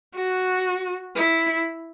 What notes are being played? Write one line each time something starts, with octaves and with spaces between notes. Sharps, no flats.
F#4
E4